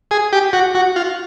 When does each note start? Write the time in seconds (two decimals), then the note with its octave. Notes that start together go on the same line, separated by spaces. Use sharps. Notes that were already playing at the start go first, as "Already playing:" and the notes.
0.11 G#4
0.33 G4
0.53 F#4
0.75 F#4
0.96 F4